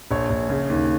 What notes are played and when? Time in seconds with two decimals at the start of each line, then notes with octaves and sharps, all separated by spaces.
0.11 A#1 C#5
0.30 A#1
0.49 C#3
0.70 D#2